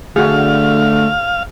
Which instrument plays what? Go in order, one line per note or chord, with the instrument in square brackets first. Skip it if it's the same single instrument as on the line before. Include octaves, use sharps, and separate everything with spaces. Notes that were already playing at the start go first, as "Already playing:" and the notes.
[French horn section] D3 [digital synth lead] A3 [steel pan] F#4 G#4 [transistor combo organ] F5